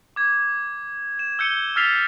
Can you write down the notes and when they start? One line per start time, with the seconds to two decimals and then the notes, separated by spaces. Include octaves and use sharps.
0.16 D6 G#6
1.19 E7
1.39 E6 G6 C#7 D#7 G7
1.76 E6 F6 A6 B6 C7 F7